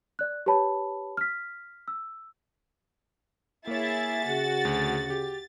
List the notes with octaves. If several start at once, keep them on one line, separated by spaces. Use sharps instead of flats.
D5 F#6
G4 B4 C#5 A5 B5
F6 B6
E6
A#3 E4 G#4 C#5 E5 A6
C#3 F#4 G#4
D2
G4